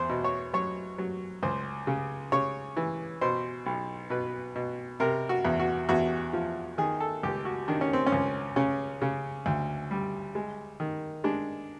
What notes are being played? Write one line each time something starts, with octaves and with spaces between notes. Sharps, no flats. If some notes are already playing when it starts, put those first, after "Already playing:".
Already playing: E2 C5
B2
C#5
F#3 C#5
F#3
C#2 C5
C#3
C#3 C#5
E3
B2 C5
B1
B2 B4
B2
C3 A#4
F#4
E2
F#4
E2 F#4
F3
D#3 G#4
A4
C#2 G4
F#4
D#3 D4
C#4
C4
C#4
C#2
C#3 C#4
C#3
D2
G3
G#3
D#3
G#3 D4